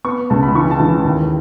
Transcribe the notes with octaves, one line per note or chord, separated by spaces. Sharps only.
B3 C#6
C#2 A5
B5
E3 C#6
A5
E3
D#2